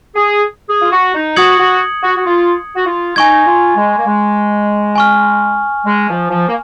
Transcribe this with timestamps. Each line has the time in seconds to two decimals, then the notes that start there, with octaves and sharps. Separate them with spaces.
0.16 G#4
0.69 G#4
0.81 F4
0.91 F#4
1.14 D#4
1.36 F#4 D#6 G#6 C#7 F#7
1.59 F#4
2.03 F#4
2.16 F#4
2.26 F4
2.76 F#4
2.87 F4
3.16 D#4 G#5 C#6 G#6
3.47 F4
3.76 G#3
3.97 A#3
4.06 G#3
4.96 G#5 C#6 F6
5.86 G#3
6.09 F3
6.31 F3
6.47 A#3